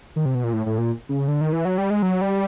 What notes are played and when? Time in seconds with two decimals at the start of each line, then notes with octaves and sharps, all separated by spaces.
0.16 D#3
0.25 C3
0.35 B2
0.44 A#2
0.53 A2
0.66 A2
0.78 A#2
1.09 C#3
1.28 D3
1.41 D#3
1.53 E3
1.65 F#3
1.78 G3
1.90 G#3
2.02 F#3
2.21 G3